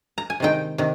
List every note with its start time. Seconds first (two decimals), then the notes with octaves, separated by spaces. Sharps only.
0.18 A#5
0.30 G#5
0.40 C3 D#3 G#3 D#4 G5
0.78 C3 D#3